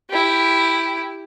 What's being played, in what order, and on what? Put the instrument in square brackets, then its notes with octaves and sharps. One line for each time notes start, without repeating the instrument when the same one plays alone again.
[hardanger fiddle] E4 G4